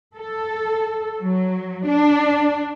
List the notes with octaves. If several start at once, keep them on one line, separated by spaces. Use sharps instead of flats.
A4
F#3
D4